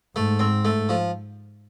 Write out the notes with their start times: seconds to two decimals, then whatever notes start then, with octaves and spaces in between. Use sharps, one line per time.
0.16 G#2 A3
0.39 C4
0.65 A3
0.89 F3